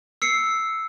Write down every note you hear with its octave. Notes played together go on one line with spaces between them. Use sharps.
E6 C7 C#7